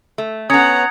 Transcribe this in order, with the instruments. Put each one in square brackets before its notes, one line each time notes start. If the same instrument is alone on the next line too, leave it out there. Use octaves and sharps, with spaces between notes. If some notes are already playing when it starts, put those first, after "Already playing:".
[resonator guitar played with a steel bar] A3
[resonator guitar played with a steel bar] B3 C#4 [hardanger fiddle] F#5 A#5 [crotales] D#6 G#6 C#7